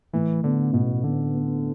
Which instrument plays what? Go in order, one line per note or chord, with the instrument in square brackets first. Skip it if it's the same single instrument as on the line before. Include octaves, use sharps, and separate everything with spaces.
[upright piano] A2 [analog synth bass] E3
[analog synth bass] D3 [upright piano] B3
[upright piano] A1 [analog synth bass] B2
[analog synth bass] D3 [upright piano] B3
[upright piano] B3